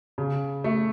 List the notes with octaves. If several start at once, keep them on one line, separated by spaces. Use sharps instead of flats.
C#3
A3